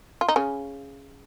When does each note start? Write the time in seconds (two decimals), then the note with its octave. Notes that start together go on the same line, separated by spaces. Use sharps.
0.21 F4
0.28 D#4
0.36 C#3 C#4